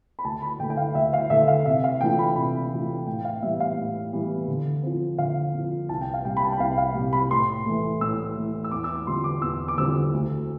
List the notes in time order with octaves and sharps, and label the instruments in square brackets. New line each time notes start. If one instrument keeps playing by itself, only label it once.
[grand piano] B5
D2 A5
B5
D3 G5
A3
G5
F5
D2 E5
F5
D3 A3 E5
F5
C3 E5
F5
E3 A3 D4 F4 G5
B5
C3 B5
E3 A3 D4 F4
A2 G5
F5
E3 G3 B3 E5
F5
A2
E3 G3 B3
D3
F3 C4
D3 F5
F3 C4
C2 A5
G5
F5
C3 G3 G5
B5
A5
G5
C2 F5
F5
C3 G3
B5
A2 C6
E3 A3
A2 E6
E3 A3
E6
E2 D6
E6
D6
D3 G3 C4 F4 C6
D6
E2 E6
D6
D3 G3 C4 F4 E6
D2